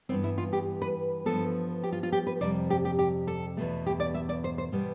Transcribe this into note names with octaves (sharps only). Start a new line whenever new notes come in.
G2 E3 B3 C4
E4
F4
G4
B4
G2 F3 B3 A4
G4
F4
F4
G4
B4
F2 C3 G3 D5
G4
G4
G4
A4
E2 B2 A3
G4
D5
E5
D5
C5
C5
B2 G3 B3